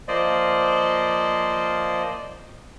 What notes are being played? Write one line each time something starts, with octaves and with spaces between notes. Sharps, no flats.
F3 A#3 C5 D5 D#5